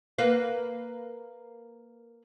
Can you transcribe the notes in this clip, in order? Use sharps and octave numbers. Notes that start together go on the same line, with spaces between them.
A#3 B4 F5